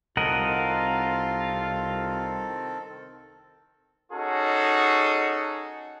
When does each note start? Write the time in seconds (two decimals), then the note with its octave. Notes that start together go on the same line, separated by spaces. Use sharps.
0.17 C2 D#3 C4 F4 A4 A#4 D#5 F#5
4.12 C#4 D#4 F#4 G#4 A4